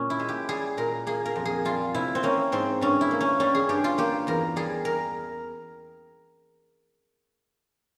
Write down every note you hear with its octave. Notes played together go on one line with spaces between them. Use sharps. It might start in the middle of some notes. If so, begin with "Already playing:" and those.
Already playing: A#2 C#4
E4
G#3
G4
G3 G#4
A#2 A#4
A#3 G#4
A#4
F2
G#4
G3 F4
C3 E4
C4
A#3 C#4
G#2 C4
G2 C#4
E4
A#3
C#4
G3 C#4
G#4
G2 G4
F4
A#3 G4
E2 A#4
G3 G#4
A#4